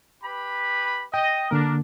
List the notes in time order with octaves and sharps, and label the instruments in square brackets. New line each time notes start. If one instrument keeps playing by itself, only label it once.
[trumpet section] G4 B4 B5
[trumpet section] D#5 [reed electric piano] G5
[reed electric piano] D3 A#3 [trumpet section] D4 A#4